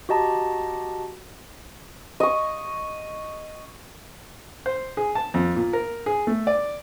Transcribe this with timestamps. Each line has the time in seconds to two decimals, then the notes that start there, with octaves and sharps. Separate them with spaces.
0.09 F#4 G4 D#5 A5 A#5
2.20 D#5 C#6
4.66 C5
4.97 G#4
5.15 A5
5.34 F2
5.56 A#2
5.73 A#4
6.06 G#4
6.27 A3
6.47 D5